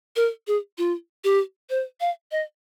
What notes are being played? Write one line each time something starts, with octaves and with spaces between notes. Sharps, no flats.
A#4
G#4
F4
G4
C5
F5
D#5